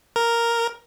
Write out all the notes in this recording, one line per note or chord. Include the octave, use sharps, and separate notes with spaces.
A#4